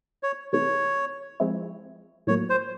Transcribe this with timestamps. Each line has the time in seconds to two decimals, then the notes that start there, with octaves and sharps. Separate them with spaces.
0.23 C#5
0.53 C3 E3 A3 C#5
1.40 F3 G#3 C4 E4
2.27 A2 F#3 A#3 C#5
2.50 C5